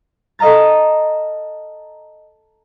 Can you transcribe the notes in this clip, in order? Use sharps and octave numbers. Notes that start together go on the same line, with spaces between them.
A4 D#5 F5 A#5 A6